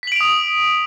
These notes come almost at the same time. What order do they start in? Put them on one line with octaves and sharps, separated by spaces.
B6 F#7 D7 F7 D#6